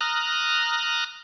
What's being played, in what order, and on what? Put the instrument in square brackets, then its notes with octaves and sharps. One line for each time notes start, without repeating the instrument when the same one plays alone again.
[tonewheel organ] A#5 D#6 F6 F#6